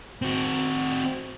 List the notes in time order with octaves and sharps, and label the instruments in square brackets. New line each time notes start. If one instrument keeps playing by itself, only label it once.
[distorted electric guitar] C4 F#4